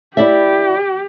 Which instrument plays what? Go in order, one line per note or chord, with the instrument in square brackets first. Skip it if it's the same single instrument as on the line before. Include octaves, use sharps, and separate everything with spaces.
[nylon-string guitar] E4 D5 E5 [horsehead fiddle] G4